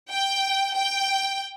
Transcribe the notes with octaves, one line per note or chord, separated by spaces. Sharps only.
G5
G5